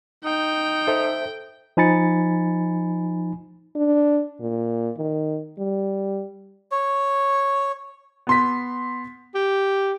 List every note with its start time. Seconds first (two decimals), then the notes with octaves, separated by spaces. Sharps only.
0.25 D#4 G5
0.87 A4 C5 E5
1.77 F3 D#4 G#5 B5 A6 C#7
3.75 D4
4.40 A#2
4.97 D#3
5.58 G3
6.72 C#5
8.27 B3 C6 B6
9.35 G4